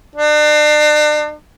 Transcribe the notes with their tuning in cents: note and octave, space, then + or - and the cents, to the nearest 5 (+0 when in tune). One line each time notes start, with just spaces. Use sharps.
D4 +40